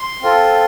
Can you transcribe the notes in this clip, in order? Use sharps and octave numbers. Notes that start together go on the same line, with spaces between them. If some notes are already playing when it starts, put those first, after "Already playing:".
Already playing: C6
C4 F4 A4